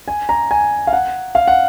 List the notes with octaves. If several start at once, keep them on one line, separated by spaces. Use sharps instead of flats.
G#5
A#5
G#5
F5
F#5
F5
F#5